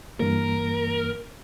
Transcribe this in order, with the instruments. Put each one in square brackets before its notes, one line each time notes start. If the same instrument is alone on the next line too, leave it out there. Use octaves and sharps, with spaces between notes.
[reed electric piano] G2 E3 A#3 [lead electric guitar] A#4